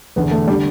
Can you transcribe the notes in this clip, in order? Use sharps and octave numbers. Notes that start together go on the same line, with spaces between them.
E1 E2 D3 B3
A3
G3
D3